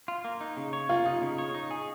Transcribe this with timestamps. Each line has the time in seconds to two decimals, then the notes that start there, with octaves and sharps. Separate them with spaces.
0.08 F4
0.25 A#3
0.41 D#4
0.57 C#3
0.73 C#5
0.89 A#3 F4
1.06 D#4
1.22 C#3
1.38 C#5
1.54 D#4
1.71 G#4